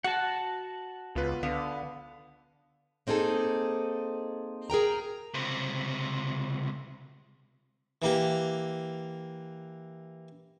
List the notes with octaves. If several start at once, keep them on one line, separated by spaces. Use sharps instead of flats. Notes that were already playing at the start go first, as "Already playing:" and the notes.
F#4 F#5 A5
C#2 B3 F4 B4
D3 B3 F5
A#3 C4 D#4 G#4 A4
G#4 A#4 G5 A#5
C#2 C3
E3 A#3 G4